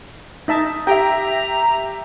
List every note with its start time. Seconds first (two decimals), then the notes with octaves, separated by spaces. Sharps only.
0.48 D#4 E5 A5
0.87 G4 E5 G5 A#5